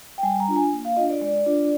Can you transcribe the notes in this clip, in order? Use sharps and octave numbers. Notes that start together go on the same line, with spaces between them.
G5
G3 G#5
A#5
D4 F4
G#5
A#3
F5
D4 F4 D#5
D5
G#3 D5
D4 F4